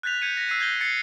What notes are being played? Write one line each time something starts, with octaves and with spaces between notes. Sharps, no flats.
F#6 G6 A6 B6 F7
G6 G#6 C#7 D#7
A#6 B6
E6 C7 D#7
G6 G#6 A#6 G7
A6 C7 C#7